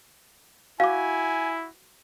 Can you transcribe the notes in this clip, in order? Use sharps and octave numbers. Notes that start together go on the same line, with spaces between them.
E4 F#4 F5 G#5 D6